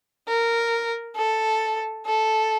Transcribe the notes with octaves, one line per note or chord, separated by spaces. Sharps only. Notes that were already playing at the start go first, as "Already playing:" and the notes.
A#4
A4
A4